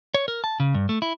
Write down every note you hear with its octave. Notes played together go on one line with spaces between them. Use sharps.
C#5
A#4
A5
C#3
G2
A3
E4